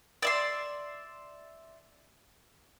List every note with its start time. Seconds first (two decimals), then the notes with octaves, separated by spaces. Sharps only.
0.22 D5 E5 C6